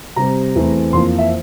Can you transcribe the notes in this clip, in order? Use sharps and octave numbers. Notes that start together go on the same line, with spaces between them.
C3 G3 C4 A#5
E2 E3 A3 C4
F2 E3 A#3 C6
E5